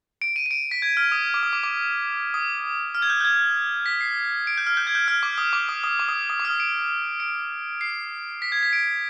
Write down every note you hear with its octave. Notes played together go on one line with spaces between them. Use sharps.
D7
D#7
D#7
D7
B6
G#6
F6
D#6
D6
D#6
D6
D6
D#6
F6
G#6
G6
G6
G#6
B6
C7
D7
G6
F6
G6
G#6
G6
F6
D6
D#6
D6
D#6
D#6
D6
D#6
D#6
D6
F6
D#6
D7
D7
C7
B6
G#6
B6
D7